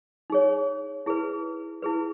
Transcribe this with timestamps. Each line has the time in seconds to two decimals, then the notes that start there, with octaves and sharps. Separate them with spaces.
0.30 D#4 G#4 C#5
1.06 E4 G#4 B4
1.82 E4 G#4 B4